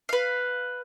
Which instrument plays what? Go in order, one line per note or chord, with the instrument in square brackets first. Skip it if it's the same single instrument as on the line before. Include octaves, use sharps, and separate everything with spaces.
[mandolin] B4 F5